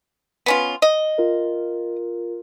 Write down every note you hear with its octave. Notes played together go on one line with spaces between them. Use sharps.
B3 C#4 F4
D#5
F4 A#4